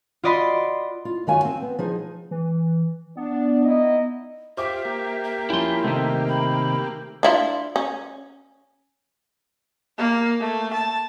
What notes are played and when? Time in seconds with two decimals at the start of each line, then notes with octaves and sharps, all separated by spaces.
0.23 F4 F#4 D5 D#5 B5 C6
1.05 F4
1.27 F#2 D#3 F#4 F5 G#5
1.45 C4
1.62 B3
1.79 F3 D#4 G#4
2.31 E3
3.17 B3 D4
3.65 D#4 E4 D#5
4.57 F4 G4 C5 E5 D6
4.85 A#3 G4
5.24 E5
5.50 F3 C#4 E4 C6
5.84 C3 D#3 A3
6.29 B5
7.23 D4 E4 F4
7.76 C#4
9.98 A#3
10.41 A3
10.74 A5